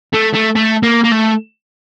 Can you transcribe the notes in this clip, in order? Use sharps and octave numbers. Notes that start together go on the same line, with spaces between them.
A3
A3
A3
A#3
A#3
A3